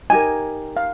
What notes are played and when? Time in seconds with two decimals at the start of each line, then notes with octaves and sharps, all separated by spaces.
0.10 D#4 G4 A#4 G#5
0.77 F5